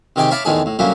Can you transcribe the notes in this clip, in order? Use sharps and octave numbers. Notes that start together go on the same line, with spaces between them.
C3 D#3 G4 G#4 G5 D6
C#5 E5 F5 A5 B5 D6
E2 A2 D3 D#3 G#4 A5
A2
D3 F#3 G3 A#3 C#4 E4